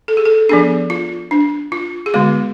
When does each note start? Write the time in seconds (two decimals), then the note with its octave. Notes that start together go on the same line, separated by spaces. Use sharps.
0.08 A4
0.17 G#4
0.25 A4
0.49 F3 B3 D4 G#4
0.90 F4
1.31 D4
1.72 F4
2.06 G#4
2.14 D3 G#3 B3 F#4